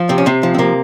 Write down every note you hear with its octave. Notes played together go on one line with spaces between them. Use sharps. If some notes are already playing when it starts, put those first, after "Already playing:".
Already playing: F3
C3 C4
C#4
C3 C4
F3
C4
C3 A#3